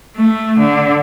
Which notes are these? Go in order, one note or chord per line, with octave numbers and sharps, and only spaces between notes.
A3
D3